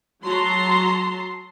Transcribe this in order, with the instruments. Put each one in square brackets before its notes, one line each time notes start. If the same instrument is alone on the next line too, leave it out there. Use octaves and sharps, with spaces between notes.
[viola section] F#3 F#4 A5 A#5 C6